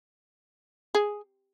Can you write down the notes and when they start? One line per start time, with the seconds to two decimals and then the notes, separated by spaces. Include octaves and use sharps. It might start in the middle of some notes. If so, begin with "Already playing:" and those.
0.95 G#4